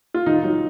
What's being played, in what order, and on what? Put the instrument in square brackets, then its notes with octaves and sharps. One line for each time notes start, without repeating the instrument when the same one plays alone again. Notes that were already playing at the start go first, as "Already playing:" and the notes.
[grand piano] F4
D#3 D#4
F#3